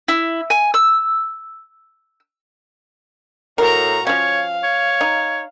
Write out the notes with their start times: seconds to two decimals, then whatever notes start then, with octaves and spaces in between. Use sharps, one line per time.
0.08 E4
0.50 G#5
0.74 E6
3.58 A2 F#4 A#4 A#5
4.07 F3 C#4 C#5 F5
4.63 C#5
5.01 D#4